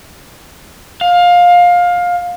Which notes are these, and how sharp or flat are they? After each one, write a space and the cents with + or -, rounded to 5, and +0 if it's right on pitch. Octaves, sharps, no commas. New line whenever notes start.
F5 +20